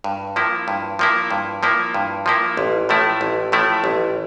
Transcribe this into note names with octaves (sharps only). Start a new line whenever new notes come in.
G2
F3 A#3 E4
G2
F3 A#3 E4
G2
F3 A#3 E4
G2
F3 A#3 E4
A1
A2 F3 A3 E4
A1
A2 F3 A3 E4
A1